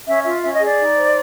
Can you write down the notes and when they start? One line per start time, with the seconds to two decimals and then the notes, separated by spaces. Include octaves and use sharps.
0.06 C#4 E5
0.24 F4 E5
0.42 C#4 E5
0.54 D#5
0.60 G#4
0.66 D5
0.78 D#4
0.96 C5